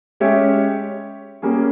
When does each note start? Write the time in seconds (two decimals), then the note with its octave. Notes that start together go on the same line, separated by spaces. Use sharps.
0.20 G#3 C#4 G4 C#5 E5
1.42 G3 A#3 C#4 G#4